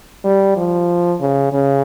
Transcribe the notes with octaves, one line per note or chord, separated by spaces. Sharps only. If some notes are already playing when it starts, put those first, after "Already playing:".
G3
F3
C#3
C#3